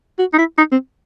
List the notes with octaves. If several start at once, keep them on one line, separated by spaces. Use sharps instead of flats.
F#4
D#4
E4
D#4
C4